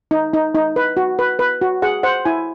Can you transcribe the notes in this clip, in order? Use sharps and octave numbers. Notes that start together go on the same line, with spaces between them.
D#4
D#4
D#4
B4
F#4
B4
B4
F#4
G#4 F#5
C5 F#5
E4 G#5